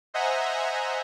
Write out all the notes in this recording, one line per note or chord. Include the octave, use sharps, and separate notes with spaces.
C5 D#5 E5 F#5 G#5 A#5